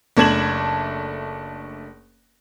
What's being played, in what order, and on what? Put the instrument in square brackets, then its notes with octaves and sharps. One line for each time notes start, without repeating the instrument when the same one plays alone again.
[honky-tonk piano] F#1 A3 D4 G#6 E7 F#7